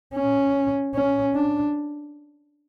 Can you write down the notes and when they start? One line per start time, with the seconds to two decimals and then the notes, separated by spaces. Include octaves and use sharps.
0.14 C#4
0.94 C#4
1.34 D4